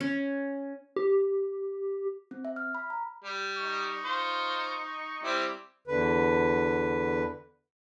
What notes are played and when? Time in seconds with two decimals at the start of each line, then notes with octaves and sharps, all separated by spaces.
0.01 C#4
0.96 G4
2.31 C4
2.45 E5
2.56 F6
2.75 B5
2.90 A#5
3.24 G3
3.58 D#4 C#6
4.05 F4 C5
5.24 G3 C4 E4 D6
5.88 E2 D3 B4